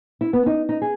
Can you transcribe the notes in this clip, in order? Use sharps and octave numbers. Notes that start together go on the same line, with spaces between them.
E4
B3
D#4
D#4
G#4